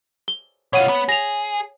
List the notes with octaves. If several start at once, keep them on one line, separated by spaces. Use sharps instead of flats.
G7
B2 F4 C#5 F#5 D#7
B3
G#4 A#6 F7